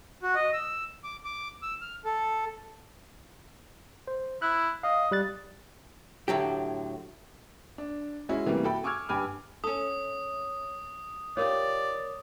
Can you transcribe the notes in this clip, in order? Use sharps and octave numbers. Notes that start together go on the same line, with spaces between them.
F#4
D#5
E6
D6
D6
E6
F6
A4
C5
E4 F#6
D#5 F5
G3 F#6 A6
A2 D3 F#3 G4
D4
G#3 C#4 E4 F#4
C3 E3 G3 A3 A#3
F#4 A4 E5 G5 B5
G#5 C#6 D6 E6 F6 G#6
G2 G4 G#5 B5 D6 F6
C#4 A4 D#6
F4 G4 A#4 C#5 D5